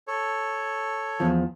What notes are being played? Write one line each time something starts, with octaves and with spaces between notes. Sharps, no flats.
A4 C#5
E2 F3